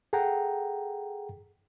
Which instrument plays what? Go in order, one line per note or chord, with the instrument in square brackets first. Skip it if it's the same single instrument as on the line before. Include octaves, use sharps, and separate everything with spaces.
[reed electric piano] G#4 A4 F#5 G5 A#5